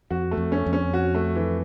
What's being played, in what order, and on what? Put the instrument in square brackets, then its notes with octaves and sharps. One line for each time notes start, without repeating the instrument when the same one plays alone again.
[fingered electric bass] F2 [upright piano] F#4
[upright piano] A3
[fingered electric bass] F2
[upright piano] C#4
[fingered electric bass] F2
[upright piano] C#4
F#4
A3
E3